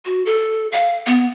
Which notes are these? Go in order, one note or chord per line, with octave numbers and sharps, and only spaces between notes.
F#4
A4
F5
B3